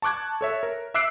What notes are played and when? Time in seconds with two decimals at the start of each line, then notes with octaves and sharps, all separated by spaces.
0.02 A5 C#6 D6 F#6 G#6
0.41 A4 C#5 E5
0.63 A#4
0.94 E5 D6 E6 F#6 C7 D7